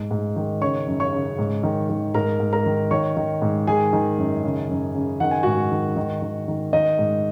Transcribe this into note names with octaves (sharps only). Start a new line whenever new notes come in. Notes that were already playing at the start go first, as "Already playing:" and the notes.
Already playing: G#2
G#2
D#3
C#3 C#5 C#6
F#2
C#5 C#6
C#3
G#2
D#3
D#3
G#2 A#4 A#5
G#2
A#4 A#5
D#3
D#3 C#5 C#6
D#3
G#2
D#3 G#4 G#5
D#3
F#2
C#3
F#2
C#3
D#3 F#5
G#5
G#2 F#4 F#5
D#3
D#3
D#3
D#3
D#3 D#4 D#5
G#2